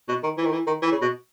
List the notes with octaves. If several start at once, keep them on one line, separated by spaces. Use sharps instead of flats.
B2
D#3
E3
D#3
E3
D#3
E3
C#3
B2